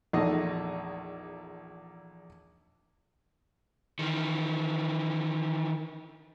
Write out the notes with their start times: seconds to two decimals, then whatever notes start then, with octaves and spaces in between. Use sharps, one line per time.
0.13 A#1 E2 A3 D#4 D#5
3.99 D#3 E3